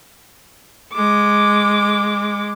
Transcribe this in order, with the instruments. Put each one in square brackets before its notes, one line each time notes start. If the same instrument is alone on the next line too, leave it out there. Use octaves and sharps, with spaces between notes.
[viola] G#3 D6